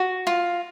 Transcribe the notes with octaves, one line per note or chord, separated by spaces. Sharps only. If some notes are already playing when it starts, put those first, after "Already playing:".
Already playing: F#4
F4